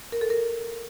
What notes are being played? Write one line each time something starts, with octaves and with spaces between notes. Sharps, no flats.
A#4
A4
A#4